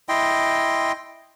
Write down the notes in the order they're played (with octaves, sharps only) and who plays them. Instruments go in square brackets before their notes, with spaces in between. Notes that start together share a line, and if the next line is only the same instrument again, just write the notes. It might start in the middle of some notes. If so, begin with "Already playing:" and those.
[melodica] E4 D#5 G5 C6